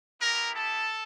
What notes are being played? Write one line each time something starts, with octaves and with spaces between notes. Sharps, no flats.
B3 E4 G4 A#4 A#5
A4 A5